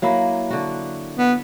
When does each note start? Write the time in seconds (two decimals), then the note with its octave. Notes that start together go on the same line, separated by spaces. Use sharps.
0.02 F#3 A#3 E4
0.50 D3 F#4
1.16 B3